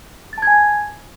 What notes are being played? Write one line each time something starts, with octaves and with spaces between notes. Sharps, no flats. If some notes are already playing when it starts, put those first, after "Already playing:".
G#5 A5 G#6 A6